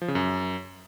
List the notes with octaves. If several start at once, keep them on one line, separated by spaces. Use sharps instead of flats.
F3
C#3
F#2